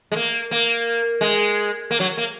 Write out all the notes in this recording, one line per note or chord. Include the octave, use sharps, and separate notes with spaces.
G#3
A#3
A#3
G#3
A#3
F#3
A#3